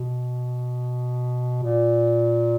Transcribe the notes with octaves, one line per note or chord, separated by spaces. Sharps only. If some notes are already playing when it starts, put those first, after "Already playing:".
Already playing: B2
A#2